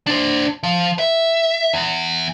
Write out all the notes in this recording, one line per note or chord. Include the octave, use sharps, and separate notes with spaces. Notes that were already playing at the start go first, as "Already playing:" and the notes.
D4 C5
F3
E5
E2